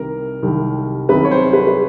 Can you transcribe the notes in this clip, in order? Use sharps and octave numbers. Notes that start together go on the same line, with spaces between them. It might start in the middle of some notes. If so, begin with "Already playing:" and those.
Already playing: C2 C3 D#3 G3 A#4
C2 C3 D#3 G3
C2 C3 D#3 G3 B4
C#5
C5
B4
B4